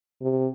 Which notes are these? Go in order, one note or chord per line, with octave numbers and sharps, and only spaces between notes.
C3